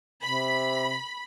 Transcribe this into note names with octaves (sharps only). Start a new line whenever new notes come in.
C3 B5